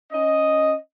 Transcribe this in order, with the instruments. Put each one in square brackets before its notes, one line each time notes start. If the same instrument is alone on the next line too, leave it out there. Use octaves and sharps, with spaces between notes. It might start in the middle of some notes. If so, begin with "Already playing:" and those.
[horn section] C#4 D#5